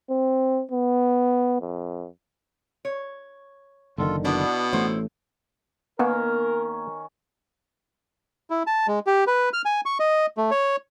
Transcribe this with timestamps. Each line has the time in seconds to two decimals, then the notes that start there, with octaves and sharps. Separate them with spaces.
0.10 C4
0.71 B3
1.61 F2
2.85 C#5
3.98 F#1 D3 D#3 F4 A4
4.25 B2 B3 D4 E4
4.73 A1 A2 E4 C5
5.99 D#3 A#3 B3 C#4 A#4
8.50 E4
8.67 A5
8.87 G#3
9.07 G4
9.27 B4
9.53 F6
9.65 G#5
9.85 C#6
9.99 D#5
10.37 A3
10.51 C#5